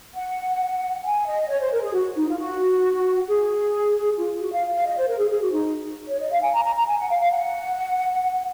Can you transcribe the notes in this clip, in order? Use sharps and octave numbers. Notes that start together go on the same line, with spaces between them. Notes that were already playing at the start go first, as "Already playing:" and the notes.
F#5
G#5
D#5
C#5
C5
A#4
G#4
F#4
D#4
F4
F#4
G#4
F4
F#4
F5
F5
D#5
C5
A#4
G#4
G#4
F#4
D#4
C#5
D#5
F5
G#5
A#5
A#5
A#5
G#5
F#5
F5
F5
F#5